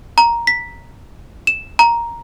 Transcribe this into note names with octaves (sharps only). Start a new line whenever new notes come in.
A#5
B6
E7
A#5